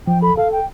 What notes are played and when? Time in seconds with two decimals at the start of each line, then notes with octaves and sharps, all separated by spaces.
0.07 F3 G5
0.22 A4 B5
0.37 A4 F5
0.52 G5